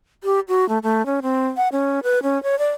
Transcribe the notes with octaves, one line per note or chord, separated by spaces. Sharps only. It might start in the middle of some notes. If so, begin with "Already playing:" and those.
G4
F#4
A3
A3
C#4
C4
F#5
C#4
B4
C#4
C#5
D5